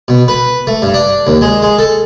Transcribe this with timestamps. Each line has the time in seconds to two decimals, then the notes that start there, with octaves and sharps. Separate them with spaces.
0.08 B2
0.28 B4
0.67 A3
0.82 G2
0.94 D4
1.27 D#2
1.41 G#3
1.62 G#3
1.79 A4